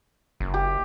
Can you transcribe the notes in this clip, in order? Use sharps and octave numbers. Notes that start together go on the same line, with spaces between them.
F#1
G4